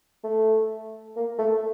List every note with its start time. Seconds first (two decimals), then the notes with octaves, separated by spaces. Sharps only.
0.23 A3
1.16 A#3
1.38 A3